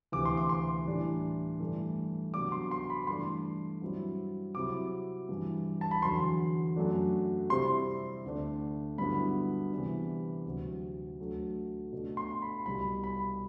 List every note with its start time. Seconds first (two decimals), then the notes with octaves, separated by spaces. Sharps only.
0.12 D2 C3 E3 D6
0.25 C6
0.37 D6
0.49 C6
0.86 A2 E3 G3 D4
1.60 G2 E3 A3
2.34 C3 F#3 B3 D4 D6
2.52 C6
2.71 C6
2.90 B5
3.03 B5
3.07 G2 E3 A3 D4 C6
3.82 G2 F#3 C4 E4
4.55 C3 F#3 C4 E4 D6
5.29 G2 E3 G3
5.81 A5
5.91 B5
6.02 E2 D3 F#3 C6
6.76 F#2 F#3 A3 D4
7.50 C3 G3 C4 E4 C6
8.25 D2 D3 A3 D4
8.98 G2 D3 F#3 B3 E4 B5
9.72 C3 E3 G3 B3 D4
10.45 D2 C3 F#3
11.19 D2 D3 F#3 A3
11.93 B2 A3 D4
12.17 C6
12.42 B5
12.66 C2 B2 G3 B5
13.04 B5